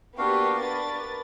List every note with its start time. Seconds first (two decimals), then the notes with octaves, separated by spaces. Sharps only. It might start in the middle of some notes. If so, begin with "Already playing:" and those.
0.18 A#3 B3 D4 F#4 G4 F5
0.61 D4 A#4 B4 A6